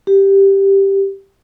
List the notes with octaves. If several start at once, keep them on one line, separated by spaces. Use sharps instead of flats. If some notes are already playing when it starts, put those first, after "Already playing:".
G4